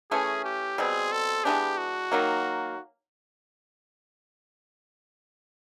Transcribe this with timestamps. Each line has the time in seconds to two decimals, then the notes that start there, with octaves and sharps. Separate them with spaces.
0.11 E3 A3 C#4 G#4
0.44 G4
0.78 B2 G3 C4 G#4
1.12 A4
1.44 E3 G#3 B3 D4 G4
1.77 F#4
2.12 D#3 F#3 A#3